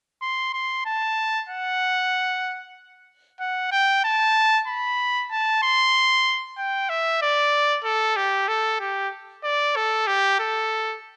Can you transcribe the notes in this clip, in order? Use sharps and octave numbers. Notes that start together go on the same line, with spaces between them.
C6
C6
A5
F#5
F#5
G5
A5
B5
A5
C6
G5
E5
D5
A4
G4
A4
G4
D5
A4
G4
A4